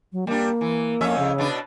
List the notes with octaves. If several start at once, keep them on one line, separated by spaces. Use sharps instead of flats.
F#3
G3 A#3 D4
E3
F2 C#4 E5
C#3
B2 D4 B4